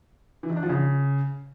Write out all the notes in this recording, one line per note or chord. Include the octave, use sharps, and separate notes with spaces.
E3
D#3
D4
F3
C#3